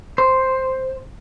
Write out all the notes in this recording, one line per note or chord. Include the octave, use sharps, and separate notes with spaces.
C5